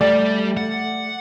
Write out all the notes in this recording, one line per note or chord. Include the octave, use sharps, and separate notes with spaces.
G3 A3 G4 D5
F#5